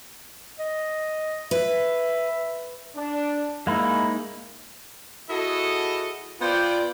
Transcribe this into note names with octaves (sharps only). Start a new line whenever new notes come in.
D#5
B4 E5
D4
G#2 G#3 A#3 D#4 E4
E4 F#4 G#4 A4 D#5
B3 F4 C5 D5 G5